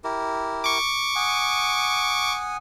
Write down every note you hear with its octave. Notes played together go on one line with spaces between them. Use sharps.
E4 G4 A#4
C#6 D6
F#5 G#5 D#6